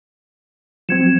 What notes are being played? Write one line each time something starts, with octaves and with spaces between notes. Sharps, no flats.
F3 F#3 C4 G#6 C#7 E7